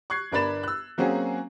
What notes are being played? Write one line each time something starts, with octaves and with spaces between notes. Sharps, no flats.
C#6 F#6 G#6 C7
G1 D4 A#4 B5 A6 E7
E6 F#6
F#3 A#3 C4 C#4 F#4 G#4